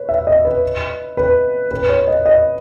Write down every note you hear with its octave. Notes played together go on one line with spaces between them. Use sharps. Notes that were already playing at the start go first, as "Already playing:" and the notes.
Already playing: B4 C#5
E5
D#5
B4
B4
B4
C#5
D#5
D#5